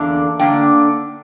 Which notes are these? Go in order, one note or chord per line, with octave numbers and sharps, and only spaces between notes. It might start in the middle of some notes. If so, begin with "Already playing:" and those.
Already playing: E2 D3 A#3 D4
D3 A#3 D4 G5